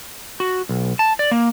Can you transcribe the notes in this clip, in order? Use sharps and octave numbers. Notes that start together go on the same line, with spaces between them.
F#4
B1
A5
D5
A#3